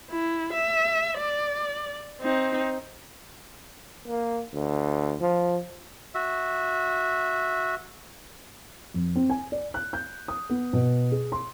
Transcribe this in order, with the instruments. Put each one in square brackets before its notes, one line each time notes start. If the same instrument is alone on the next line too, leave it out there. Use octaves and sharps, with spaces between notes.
[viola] E4
E5
D5
C4 D#4
[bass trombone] A#3
D2
F3
[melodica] F#4 E5
[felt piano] F2
C4
G#5
D5
F#6
G6
D#6
B3
B2
G#4
C6